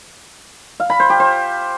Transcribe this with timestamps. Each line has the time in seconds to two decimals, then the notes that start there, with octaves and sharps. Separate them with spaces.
0.80 F5
0.90 B5
1.00 C5
1.10 G4
1.20 C5